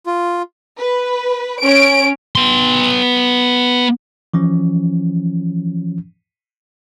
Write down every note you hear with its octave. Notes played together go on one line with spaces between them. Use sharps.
F4
B4
C#4 D7
B3 C6
E3 F3 C#4